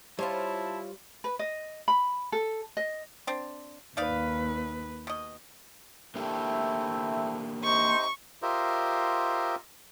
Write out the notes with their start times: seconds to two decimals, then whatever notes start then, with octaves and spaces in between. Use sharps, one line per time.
0.19 G3 E4 F4 C5 C#5 A5
1.24 B4
1.39 D#5
1.88 B5
2.32 A4
2.77 D#5
3.27 C4 D4
3.97 D#2 D#4 B4 D5 F5
5.07 B2 D#5
6.16 A3 A#3 C4 D4 E4 G4
7.63 C3 D#4 C5 C#6
8.42 F4 G4 A#4 C5 D#5 E5